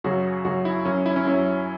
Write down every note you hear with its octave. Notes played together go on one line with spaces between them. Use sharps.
F#2 C#3 F#3 F#4
F#2 C#3 F#3 F#4
E4
F#2 F#3 C#4
E4
C#4
F#2 F#3 E4